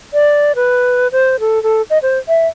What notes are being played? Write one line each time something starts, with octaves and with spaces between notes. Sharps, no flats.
D5
B4
C5
A4
A4
D#5
C5
E5